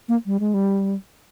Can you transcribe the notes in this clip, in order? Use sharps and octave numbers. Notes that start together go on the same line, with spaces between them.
A#3
G3
G#3
G3